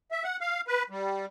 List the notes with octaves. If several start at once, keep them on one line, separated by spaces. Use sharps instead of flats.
E5
F#5
F5
B4
G3